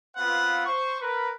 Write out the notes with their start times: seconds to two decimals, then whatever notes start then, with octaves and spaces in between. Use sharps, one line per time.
0.17 B3 C4 F4 B4 F5 F#5
0.66 C5 C#6
1.01 A#4 B4